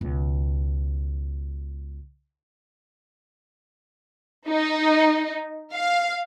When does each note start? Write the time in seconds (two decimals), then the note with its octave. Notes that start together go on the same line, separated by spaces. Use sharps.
0.01 C#2 B2
4.49 D#4
5.72 F5